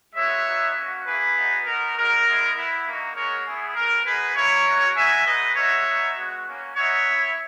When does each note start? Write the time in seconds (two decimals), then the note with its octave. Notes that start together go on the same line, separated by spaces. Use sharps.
0.15 G#3 B3 F#4 C#5 E5
0.45 B3 D#4 F#4
0.76 A#3 C#4 F#4
1.05 A#3 E4 G#4 B4
1.35 B3 D#4 F#4
1.65 B3 D#4 F#4 A#4
1.96 G#3 D#4 F#4 A#4
2.25 G#3 B3 E4
2.56 B3 E4
2.86 A#3 D#4 F#4
3.15 G#3 C#4 F#4 A#4 C#5
3.45 B3 E4 G#4
3.75 G#3 B3 F#4 A#4
4.05 G#3 D#4 F#4 G#4 B4
4.35 A#3 E4 A#4 C#5
4.66 G#3 C#4 F#4
4.95 G#3 D#4 F#4 E5 G#5
5.25 G#3 D#4 F#4 B4 D#5
5.55 G#3 D#4 F#4 C#5 E5
5.86 B3 D#4 F#4
6.15 G#3 B3 F#4
6.45 A#3 C#4 F#4
6.75 B3 D#4 F#4 C#5 E5
7.06 B3 E4